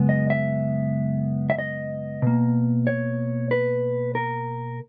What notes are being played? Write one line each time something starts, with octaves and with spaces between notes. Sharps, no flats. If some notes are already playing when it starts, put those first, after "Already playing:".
Already playing: F#2 C#3 G#3 B3
D#5
E5
E5
D#5
B2 A#3
C#5
B4
A#4